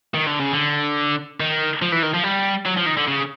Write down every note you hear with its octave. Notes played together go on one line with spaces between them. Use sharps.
D#3
D3
C#3
D3
D#3
F3
E3
D#3
F3
G3
F#3
F3
D#3
D3
C#3